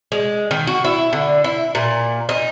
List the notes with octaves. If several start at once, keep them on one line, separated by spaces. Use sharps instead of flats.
G#3
D#3
F#4
E4
D3
E4
A#2
D#4